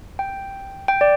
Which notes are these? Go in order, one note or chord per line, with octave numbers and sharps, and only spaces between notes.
G5
G5
D5